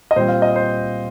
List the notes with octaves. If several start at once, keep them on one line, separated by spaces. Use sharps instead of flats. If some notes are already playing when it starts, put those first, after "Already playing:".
D#5
A#2 G3 C4 C5
F5
D#5
C5